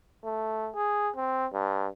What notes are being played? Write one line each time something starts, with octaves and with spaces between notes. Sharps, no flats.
A3
G#4
C4
G2